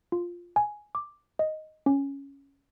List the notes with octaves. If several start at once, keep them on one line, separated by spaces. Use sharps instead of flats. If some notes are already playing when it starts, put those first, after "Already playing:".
F4
G#5
D6
D#5
C#4